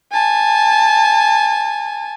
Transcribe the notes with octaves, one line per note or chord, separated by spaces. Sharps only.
G#5 A5